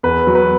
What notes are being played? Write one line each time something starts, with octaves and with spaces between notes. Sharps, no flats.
E2 B4
F#3
B4